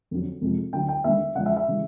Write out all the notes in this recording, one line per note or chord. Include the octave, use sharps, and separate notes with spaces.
F2 D3 F#3
F2 C3 F3 G#3
D2 D3 F#3 G5
G5
D#2 D3 G3 E5
E2 C#3 F3 G#3 F#5
E5
E5
C#3 E3 G3